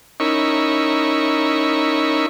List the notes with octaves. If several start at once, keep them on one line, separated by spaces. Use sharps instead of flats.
C#4 D#4 E4 A#4 B5 C#6